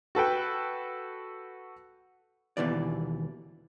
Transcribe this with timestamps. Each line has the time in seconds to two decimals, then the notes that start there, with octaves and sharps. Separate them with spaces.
0.15 F#4 A4 B4 G5
2.57 D#2 B2 E3 D5